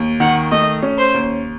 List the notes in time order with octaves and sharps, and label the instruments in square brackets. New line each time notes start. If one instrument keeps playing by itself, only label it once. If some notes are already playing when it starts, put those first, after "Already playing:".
Already playing: [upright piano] D#2
[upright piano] D#3 [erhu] F#5
[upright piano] A3 [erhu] D#5
[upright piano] C#4
[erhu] C5
[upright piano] D#2